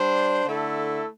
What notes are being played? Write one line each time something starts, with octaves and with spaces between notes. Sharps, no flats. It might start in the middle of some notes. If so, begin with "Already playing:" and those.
Already playing: G3 D4 C5
D3 A3 E4 A4